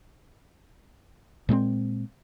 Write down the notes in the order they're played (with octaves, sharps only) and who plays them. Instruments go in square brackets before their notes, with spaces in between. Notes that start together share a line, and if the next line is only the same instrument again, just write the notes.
[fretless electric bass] A#2 G#3 A3 C4